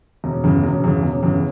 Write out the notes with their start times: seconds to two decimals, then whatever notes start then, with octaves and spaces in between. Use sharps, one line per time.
0.24 E1
0.44 E2 C#3
0.64 E1
0.84 E2 C#3
1.03 E1
1.23 E2 C#3